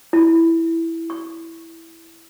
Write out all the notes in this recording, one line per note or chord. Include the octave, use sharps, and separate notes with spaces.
E4
C#6